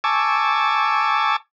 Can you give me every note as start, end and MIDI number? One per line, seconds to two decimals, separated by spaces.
0.04 1.36 80
0.04 1.36 81
0.04 1.36 85
0.04 1.36 86
0.04 1.36 88